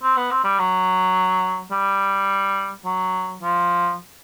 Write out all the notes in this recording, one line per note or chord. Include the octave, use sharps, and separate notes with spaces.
C4
B3
C4
G3
F#3
G3
F#3
F3